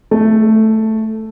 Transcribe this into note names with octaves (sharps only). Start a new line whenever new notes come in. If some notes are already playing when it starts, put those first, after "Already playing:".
A3